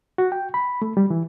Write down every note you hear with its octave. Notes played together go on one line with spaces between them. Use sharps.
F#4
G5
B5
A3
G3
E3